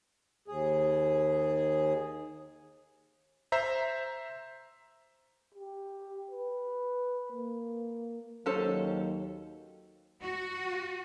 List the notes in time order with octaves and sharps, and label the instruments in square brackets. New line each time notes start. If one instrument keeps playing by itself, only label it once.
[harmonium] D#2 G#4
[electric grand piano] C5 E5 A#5
[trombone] G4
B4
A#3
[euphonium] D#2 [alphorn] F#3 [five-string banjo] C#4 A4 C5
[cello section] F#4